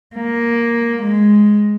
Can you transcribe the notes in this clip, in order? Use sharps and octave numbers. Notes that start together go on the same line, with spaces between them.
A#3
G#3